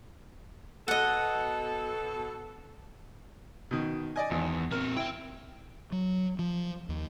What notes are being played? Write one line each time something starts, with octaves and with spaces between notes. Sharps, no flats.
B2 A4 D#5 F#5
B2 D#3
D5 D#5 G#5
G#1 E2
A#2 C4 A#4
C4 E4 G5
F#3
F3
D#2